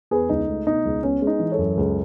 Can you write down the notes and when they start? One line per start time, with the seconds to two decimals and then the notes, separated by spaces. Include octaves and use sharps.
0.11 E2 G#4 B4
0.29 C#2 D#4
0.48 A3
0.66 B2 D#4
0.85 C#2
1.03 B3 C#4
1.22 G#3
1.27 D#4
1.39 E3
1.52 A4 C#5
1.58 F#2
1.77 C#2